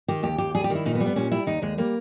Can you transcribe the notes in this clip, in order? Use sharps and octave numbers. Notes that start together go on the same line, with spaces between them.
D#3 G4
D#2 G4
D#2 G4
G3 G#4
G4
D#3
E4
A#2 D#4
B3
G3
B3
A#2 C#4
G3 E4
D#2 D#4
D#2 G#3
G3 A#3